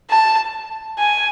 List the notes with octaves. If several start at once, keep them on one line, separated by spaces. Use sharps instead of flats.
A5
G#5